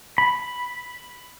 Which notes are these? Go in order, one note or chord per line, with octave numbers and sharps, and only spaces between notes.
B5